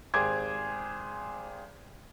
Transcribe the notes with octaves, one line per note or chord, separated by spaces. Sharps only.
G#1 G4 G#4 C5 D6 G#6